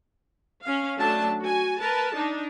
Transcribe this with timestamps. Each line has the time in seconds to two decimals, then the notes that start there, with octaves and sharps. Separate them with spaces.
0.63 C#4 F5
0.98 F#3 A3 D4 A5
1.42 F#4 G#5
1.80 A#4 B4 A5
2.15 D4 D#4